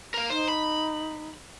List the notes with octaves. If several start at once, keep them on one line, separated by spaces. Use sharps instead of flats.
A#4 F5
D#4 C5
B5